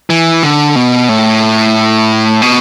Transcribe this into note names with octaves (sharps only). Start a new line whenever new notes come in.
E3
D3
B2
A2
B2